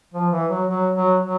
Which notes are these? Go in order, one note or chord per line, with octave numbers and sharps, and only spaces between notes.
F3
E3
F#3
F#3
F#3
F#3